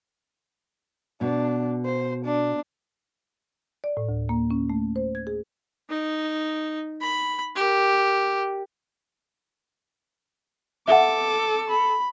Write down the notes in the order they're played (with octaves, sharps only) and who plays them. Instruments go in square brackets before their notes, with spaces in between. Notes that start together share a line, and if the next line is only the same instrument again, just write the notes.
[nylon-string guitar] B2 [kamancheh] D4
[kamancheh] C5
D4
[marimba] D5
A2
D2
A#3
C#4
A3
C5
G#6
G#4
[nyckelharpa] D#4
B5
G4 A#4
[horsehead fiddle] A4 [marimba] E5 F#5 [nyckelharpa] D6
[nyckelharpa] B5